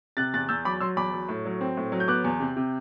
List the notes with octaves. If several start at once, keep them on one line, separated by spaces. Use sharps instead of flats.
C3 F#6 A6
E2 F#6 A6
E2 E6 G6
F#3 B5 D6
F#3 C6 E6
E2 B5 D6
F#3
A2
F#3
C4
A2
F#3
G6
B3 D6 F#6
E2
C3
C3